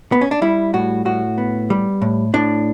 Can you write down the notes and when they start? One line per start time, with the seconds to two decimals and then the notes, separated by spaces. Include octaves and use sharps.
0.12 B3
0.21 C#4
0.31 D4
0.42 G3 E4
0.74 A2 F#4
1.05 A2 F#4
1.38 B3
1.70 G3
2.02 A2
2.34 A2 D4